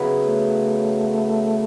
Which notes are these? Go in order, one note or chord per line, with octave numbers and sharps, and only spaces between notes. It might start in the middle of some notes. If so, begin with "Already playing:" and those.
Already playing: C#3 F#3 B3 E4
A3